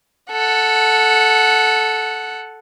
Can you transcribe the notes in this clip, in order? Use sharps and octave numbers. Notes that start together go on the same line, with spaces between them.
A4 F#5